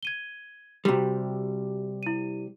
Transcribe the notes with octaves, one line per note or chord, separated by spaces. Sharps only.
G#6 D#7 G7
C3 G3 F#4 G4
E4 D#7